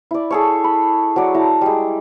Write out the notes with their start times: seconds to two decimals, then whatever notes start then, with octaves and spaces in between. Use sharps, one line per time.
0.11 E4 D5
0.31 G#4 A4 C#5
0.64 B5
1.16 F#3 F#4 D5
1.35 E4 A5 A#5
1.61 G3 G#3